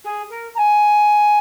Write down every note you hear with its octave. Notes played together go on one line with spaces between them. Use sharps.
G#4
A#4
A#5
G#5